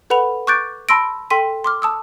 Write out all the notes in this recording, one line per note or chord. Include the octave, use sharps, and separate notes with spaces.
A4 B4 F#5 B5 F7
C#6 D6 F#6 G6 A6 D7
A5 B5 C6 E6 A#6 D7
A4 G5 C6 B6 D#7
C6 D6 F6
A5 D#6 E6